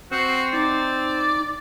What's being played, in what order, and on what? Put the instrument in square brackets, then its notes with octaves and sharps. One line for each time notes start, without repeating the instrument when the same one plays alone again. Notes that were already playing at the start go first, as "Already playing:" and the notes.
[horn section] C4 [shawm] F#4 [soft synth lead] C7
[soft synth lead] D#4 [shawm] D5